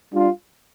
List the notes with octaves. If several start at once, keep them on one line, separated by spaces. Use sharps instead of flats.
G3 D4 F4